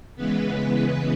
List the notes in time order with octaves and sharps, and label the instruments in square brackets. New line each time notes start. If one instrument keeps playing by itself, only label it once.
[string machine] C#3 E3 G#3 B3 B4